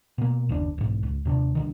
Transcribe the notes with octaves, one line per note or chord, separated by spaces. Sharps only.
B2 A#3
F#1 D#2 D4
B1 G#2
C#2
D#2 C3 A3 D4
C2 D3 D#3